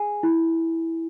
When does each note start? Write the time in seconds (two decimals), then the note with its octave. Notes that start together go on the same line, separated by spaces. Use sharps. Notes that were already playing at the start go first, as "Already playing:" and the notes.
Already playing: G#4 G#5
0.23 E4